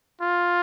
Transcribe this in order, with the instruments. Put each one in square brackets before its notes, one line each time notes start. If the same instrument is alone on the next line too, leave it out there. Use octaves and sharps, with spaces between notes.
[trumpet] F4